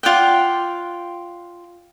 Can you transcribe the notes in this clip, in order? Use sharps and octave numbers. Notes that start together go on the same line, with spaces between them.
F4 D5 F#5 G5